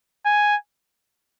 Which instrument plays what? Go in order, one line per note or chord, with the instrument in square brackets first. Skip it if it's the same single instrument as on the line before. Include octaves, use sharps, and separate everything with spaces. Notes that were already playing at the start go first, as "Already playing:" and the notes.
[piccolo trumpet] G#5